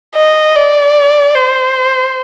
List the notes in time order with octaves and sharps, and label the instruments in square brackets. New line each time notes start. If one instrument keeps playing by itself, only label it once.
[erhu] D#5
D5
C5